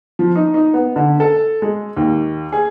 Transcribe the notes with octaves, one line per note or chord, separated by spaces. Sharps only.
F3
D#4
D#4
B3
D3
A4
G#3
D#2
G#4